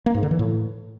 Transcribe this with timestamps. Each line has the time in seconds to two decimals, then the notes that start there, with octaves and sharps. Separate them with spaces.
0.06 A#3
0.14 G#2
0.23 D3
0.31 E3
0.39 A2